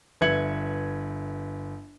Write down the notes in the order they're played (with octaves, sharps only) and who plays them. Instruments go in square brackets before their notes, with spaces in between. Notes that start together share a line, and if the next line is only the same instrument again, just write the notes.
[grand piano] G1 B4 E5 G#6 C#7 F#7